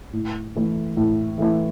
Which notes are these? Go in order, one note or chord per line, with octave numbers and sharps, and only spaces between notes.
A2
E3 A3 E4
A2
E3 A3 E4